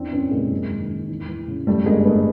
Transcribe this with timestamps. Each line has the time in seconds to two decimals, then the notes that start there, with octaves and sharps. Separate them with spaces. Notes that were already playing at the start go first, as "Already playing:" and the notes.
Already playing: E2 C4 D4
0.12 F#1 B3 C#4
0.31 C3 G#3 A#3
0.51 F#2
0.70 G#1
0.90 D#3
1.09 E2
1.28 E3
1.48 C#3
1.67 F#2 G3 A3
1.86 G1 G#3 A#3
2.05 D3 A3 B3